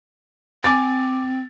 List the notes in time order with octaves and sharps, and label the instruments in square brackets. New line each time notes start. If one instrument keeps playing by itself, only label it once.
[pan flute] C4 [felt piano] G#5 D6 A6